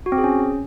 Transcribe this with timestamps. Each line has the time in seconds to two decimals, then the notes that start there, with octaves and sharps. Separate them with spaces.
0.06 F#4
0.12 C4
0.18 G#4
0.24 C#4